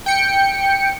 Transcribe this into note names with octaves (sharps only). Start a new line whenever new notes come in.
G5 C#7